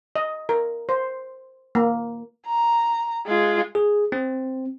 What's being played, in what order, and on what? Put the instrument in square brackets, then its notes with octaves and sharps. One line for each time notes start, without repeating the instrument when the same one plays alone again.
[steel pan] D#5
A#4
C5
A#3
[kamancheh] A#5
G#3 F4
[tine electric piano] G#4
C4